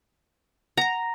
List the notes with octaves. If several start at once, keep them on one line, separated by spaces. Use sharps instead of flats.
F#5 A#5 A#6